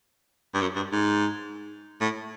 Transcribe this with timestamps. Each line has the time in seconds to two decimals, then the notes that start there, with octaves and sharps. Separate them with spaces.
0.54 G2
0.61 F#2
0.76 G2
0.93 G#2
2.01 A2